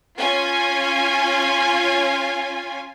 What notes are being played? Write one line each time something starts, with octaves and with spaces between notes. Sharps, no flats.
C#4 F4 G#5